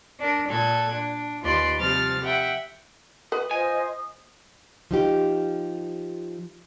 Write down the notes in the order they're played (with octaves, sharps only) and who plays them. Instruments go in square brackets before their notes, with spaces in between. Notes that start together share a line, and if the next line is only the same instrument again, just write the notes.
[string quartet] D4 A#4
A#2 A4 F#6 G#6
D4
D#2 F4 B4 D5 C6
C3 F3 G3 F6 A6
E5 F#5 G5
[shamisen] B4 B5 [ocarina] D#6
[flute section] F4 C5 D#5 [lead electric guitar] G#5
[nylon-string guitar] F3 D#4 G4